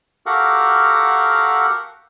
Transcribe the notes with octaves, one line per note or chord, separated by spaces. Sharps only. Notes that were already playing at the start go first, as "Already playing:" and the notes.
F#4 G4 A4 A#4 F5 F#5